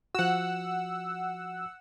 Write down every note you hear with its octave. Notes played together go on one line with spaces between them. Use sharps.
F3 F#4 F#5 E6